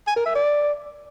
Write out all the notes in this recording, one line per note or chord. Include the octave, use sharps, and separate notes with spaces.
G#5
A#4
E5
D5